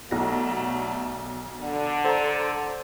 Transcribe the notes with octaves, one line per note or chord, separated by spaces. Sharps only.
B1 F#3 G3 A3 A#6
D3
A4 C5 F#5 A#5